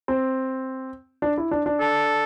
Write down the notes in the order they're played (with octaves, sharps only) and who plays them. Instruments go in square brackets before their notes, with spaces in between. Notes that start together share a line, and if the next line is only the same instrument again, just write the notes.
[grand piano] C4
D4
E4
D4
D4
[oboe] A4